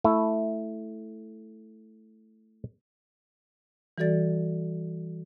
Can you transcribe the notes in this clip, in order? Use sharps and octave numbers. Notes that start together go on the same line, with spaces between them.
A3 E4
E3 G3 F#4 A4 D5 A6